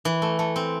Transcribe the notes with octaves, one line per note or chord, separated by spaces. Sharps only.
E3
A3
A3
C4